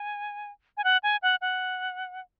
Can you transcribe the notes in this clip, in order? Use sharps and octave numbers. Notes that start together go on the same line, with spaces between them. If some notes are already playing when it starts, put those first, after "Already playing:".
Already playing: G#5
G#5
F#5
G#5
F#5
F#5